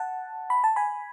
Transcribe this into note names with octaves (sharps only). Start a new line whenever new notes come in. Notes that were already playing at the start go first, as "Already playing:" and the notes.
Already playing: F#5 A5
B5
A5
G#5 B5